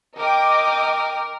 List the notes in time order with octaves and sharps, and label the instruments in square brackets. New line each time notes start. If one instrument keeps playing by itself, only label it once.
[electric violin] A#4 [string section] D#5 G5 D6